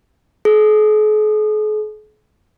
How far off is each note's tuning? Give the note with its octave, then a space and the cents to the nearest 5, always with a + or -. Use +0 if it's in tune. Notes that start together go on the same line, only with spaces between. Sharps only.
G#4 +45